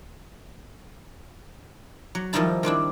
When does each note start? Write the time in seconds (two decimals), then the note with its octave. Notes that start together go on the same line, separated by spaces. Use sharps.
2.15 F#3
2.33 D#3 F3 G3 D#4 E4 A5
2.63 D#3 C4 D4 E4